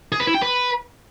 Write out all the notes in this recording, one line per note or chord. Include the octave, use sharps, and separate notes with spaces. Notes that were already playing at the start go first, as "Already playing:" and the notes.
G#4
B4
E4
G5
B4